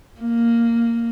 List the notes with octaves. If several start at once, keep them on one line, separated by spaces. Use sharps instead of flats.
A#3